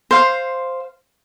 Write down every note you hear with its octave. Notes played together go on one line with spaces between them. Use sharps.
C5 F5